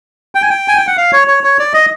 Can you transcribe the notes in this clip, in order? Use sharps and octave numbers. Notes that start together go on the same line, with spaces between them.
G5
G#5
G5
G#5
G5
F#5
F5
C#5
C#5
C#5
D5
D#5